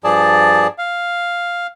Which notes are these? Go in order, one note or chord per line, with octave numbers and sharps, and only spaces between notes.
G2 F3 G#4 D5 A5
F5